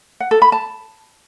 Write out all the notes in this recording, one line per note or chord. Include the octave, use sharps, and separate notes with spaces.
F#5
A4
B5
A5